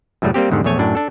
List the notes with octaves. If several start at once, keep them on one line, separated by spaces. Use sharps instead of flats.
F#2 A2 C#3 G3 A3
G3 A#3 C4 G4
E2 G#2 D3 D#3 G3
A#1 E2 A3 C#5 G#5
F#2 A2 D4
D4 A4